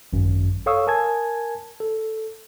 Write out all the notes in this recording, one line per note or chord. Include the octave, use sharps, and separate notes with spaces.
G#1 F#2
A4 C#5 F5 C#6 D#6 E6
A#4 G#5 A5 G#6
A4